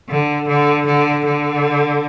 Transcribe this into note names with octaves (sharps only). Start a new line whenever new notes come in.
D3
D3
D3
D3